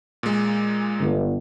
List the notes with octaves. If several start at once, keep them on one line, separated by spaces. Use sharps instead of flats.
A#2 G#3
G1